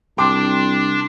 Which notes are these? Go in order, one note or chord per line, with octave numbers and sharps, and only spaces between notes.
C2 D4 G5 C6 D6